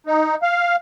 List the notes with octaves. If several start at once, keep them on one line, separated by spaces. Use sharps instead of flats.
D#4
F5